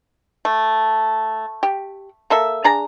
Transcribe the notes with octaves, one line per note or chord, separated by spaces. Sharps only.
A3
G4
A#3 A4 E5
D4 G#4 A#5